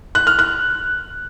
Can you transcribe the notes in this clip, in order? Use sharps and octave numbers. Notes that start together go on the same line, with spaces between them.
F#6
F6
F#6